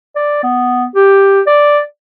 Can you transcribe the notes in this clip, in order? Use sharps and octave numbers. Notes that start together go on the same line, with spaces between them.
D5
B3
G4
D5